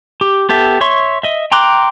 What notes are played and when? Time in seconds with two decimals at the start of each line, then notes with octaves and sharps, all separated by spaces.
0.21 G4
0.49 B3 G4 A4 E5
0.81 C#5 E5 C6 C#6
1.23 D#5 E5
1.52 G5 A#5 C6 D6 F#6